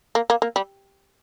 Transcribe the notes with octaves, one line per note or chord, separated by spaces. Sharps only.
A#3
A#3
A#3
G3